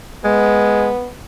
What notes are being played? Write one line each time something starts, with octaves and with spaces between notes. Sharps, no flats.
G#3 B3